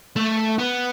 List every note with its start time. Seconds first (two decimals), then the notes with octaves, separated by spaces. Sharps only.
0.16 A3
0.59 B3